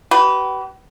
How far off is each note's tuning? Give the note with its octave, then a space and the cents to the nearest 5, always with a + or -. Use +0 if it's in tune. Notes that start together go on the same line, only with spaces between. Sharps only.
G4 -40 B4 +0